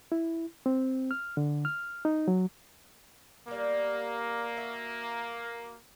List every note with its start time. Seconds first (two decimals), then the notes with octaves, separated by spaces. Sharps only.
0.12 E4
0.66 C4
1.11 F6
1.37 D3
1.65 F6
2.05 D#4
2.28 F#3
3.48 G3 A#3 B3
4.57 F#4 E5